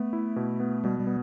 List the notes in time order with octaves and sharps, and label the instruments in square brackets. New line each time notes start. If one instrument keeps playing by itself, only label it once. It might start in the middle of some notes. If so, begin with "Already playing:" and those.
Already playing: [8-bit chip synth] A3 [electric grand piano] B3
[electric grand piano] E4
B2
B3
[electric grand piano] B2 [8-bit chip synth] G3
[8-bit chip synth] G3
[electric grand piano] B3